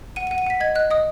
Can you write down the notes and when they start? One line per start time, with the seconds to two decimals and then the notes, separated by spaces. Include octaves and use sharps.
0.16 F#5 D#7
0.27 D#7
0.31 F#5
0.38 D#7
0.46 F#5 B6
0.60 D#5 G#6
0.75 D#5 F#6
0.91 D#5 D#6